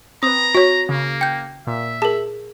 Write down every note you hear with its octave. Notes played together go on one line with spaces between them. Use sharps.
C4 B4 A#5 D#6
F#4 C#5 B6
C#3 A#3
G5 G6
A#2 E5
G#4 A#4 A5